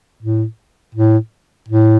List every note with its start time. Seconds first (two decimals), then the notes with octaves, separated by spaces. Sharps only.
0.22 A2
0.95 A2
1.69 A2